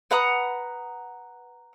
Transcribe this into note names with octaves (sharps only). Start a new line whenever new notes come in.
B4 F#5 A#5 D#6